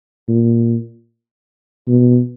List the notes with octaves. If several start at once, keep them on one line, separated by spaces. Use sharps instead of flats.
A#2
B2